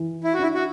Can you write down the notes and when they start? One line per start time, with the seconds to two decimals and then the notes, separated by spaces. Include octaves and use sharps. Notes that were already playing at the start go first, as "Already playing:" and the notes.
Already playing: E3
0.24 E4
0.34 F#4
0.39 D4 E4
0.54 F#4